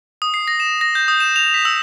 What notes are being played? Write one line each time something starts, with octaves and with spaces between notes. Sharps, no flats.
D#6
C7
A#6
E7
A#6
G6
D#6
E7
F7
B6
E6